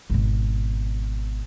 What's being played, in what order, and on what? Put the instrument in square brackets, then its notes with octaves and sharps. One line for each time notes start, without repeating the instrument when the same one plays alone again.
[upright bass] G#1 B2